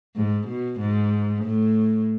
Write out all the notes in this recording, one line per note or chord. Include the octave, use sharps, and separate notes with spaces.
G#2
B2
G#2
A2